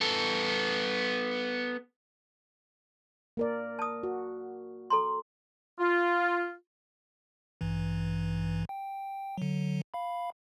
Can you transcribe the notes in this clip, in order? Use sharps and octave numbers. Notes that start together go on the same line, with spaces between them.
B3 A4
A#3 A#4 D5
A5 D#6
F#4
A4 A#5 C6
F4
A1 G2 E3
G5
D3 F#3
F5 B5